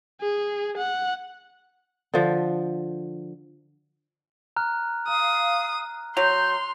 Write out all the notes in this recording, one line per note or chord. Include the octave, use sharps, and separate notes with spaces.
G#4
F#5
D3 F3
A#5 F6 F#6
F5 A#5 D#6
F#3 C6 G6 F7